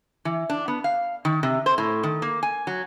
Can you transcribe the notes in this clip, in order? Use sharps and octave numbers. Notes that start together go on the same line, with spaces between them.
E3
D4
B3
F5
D#3
C3
C5
A2
D#3
A#3
G#5
F#3